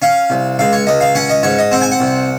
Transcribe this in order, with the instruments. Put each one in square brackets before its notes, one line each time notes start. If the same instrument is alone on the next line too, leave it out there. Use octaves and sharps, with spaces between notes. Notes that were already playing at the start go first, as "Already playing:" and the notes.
[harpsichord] C#4 F5
C2
C#2 F5
C#5
C#2 D#5
F5
C#4 F#5
D#5
G#2 C#5
D#5
C4 F#5
G#5
F#5
C2